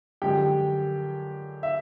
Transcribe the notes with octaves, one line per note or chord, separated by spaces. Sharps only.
F#2 D3 F3 G#3 G4 G5
E5